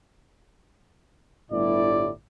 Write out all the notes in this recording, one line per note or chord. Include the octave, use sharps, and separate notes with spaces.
G1 A2 E4 D5